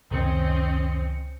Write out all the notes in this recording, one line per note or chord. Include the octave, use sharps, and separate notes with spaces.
C#2 F#2 C3 D#3 C4 C#4 D#5 C#7